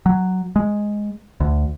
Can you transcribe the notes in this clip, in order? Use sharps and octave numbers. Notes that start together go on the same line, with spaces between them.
F#3
G#3
D2